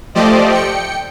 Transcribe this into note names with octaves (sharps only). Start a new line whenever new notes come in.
F3 A3 G4 C5 D5 D#5
G5 C#7